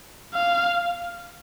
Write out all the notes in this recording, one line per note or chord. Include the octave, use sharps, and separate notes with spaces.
F5